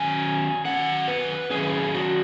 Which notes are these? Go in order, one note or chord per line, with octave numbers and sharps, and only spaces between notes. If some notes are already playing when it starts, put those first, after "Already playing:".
Already playing: D#3 F#3 C#4 G#5
D#3 F#3 C#4 F#5
B4
D#3 F#3 C#4 G#4
F#4